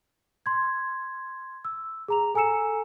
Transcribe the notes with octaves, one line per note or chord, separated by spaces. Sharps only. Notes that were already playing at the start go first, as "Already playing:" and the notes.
C6 G#6
E6
G#4 A#5 F7
A4 G#5 A#5 E6 C#7 E7